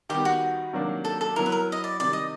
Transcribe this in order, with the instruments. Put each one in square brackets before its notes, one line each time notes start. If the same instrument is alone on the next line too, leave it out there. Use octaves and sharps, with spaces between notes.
[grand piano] D#3 G3 B3 [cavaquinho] G4
[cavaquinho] F#4
[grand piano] C3 D#3 F#3 A#3 D4
[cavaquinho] A4
A4
[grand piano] F#3 B3 E4 [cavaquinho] A#4
[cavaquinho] B4
A#4
D#5
D5
[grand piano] C3 D#3 G3 [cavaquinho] D5
[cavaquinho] D#5